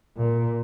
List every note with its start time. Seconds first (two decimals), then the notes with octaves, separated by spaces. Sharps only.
0.17 A#2